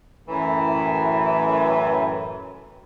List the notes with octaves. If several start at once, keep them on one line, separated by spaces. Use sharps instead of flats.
F#2 A2 E3